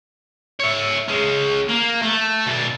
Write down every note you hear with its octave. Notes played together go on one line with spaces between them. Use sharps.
C#5 E5
G#3 C#4
A#3
A3
B2 D5